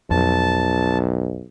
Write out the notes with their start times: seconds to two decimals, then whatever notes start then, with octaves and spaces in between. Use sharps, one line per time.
0.11 B1 F2 A5